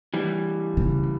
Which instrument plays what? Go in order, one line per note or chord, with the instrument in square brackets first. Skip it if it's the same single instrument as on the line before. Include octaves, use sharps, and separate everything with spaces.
[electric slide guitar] E3 G3
[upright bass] C#3